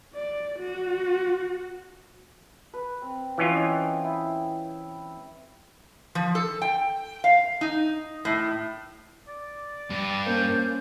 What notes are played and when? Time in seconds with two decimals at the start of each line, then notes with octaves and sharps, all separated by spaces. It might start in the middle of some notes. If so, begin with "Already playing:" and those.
0.14 D5
0.59 F#4
2.74 B4
3.02 C4
3.38 E3 C#4 F4
3.55 D#5 G5
4.04 E4
6.15 F3
6.35 A4
6.62 G5
7.24 F5
7.61 D#4
8.25 A2
9.28 D5
9.91 G2
10.26 A#3 C#4 C5 G6